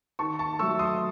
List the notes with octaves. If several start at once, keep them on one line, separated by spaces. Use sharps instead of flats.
D#3 A5 C#6
A5 C#6
F#3 A3 C#6 E6
C6 D#6